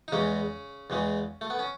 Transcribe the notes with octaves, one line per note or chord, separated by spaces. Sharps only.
D#4
E2 C#3 E3 G#3 C#4
E2 C#3 E3 G#3
A3
B3
C#4